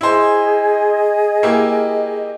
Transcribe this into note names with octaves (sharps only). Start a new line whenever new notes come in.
E4 G#4 C5 D#5
A#3 E4 G4